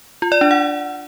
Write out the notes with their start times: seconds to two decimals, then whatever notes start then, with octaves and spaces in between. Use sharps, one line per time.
0.22 F4
0.32 D5
0.41 D4
0.51 F#5